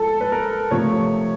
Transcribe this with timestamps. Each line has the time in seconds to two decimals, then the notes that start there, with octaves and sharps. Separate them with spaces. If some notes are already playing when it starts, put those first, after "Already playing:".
Already playing: F3 G#3 A4
0.21 B4
0.32 A#4
0.71 C3 F3 A3 C#5